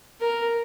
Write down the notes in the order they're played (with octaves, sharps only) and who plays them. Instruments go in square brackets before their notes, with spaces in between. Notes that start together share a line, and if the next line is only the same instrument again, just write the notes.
[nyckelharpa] A#4